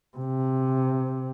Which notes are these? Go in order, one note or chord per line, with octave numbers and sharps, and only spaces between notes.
C3